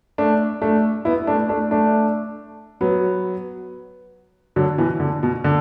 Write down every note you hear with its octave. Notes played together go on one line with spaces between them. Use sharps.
A3 D4
A3 D4
B3 E4
A3 D4
A3 D4
A3 D4
F#3 B3
D3 F#3
B2 E3
D3
B2
D3